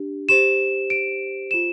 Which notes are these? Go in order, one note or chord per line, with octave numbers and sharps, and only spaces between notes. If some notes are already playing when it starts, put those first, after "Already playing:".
Already playing: D4 G4
G4 C5 E7
D7
F4 C5 E7